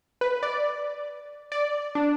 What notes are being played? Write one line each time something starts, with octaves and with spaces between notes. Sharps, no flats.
B4
D5
D5
D4